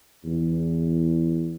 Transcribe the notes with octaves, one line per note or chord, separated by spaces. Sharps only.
E2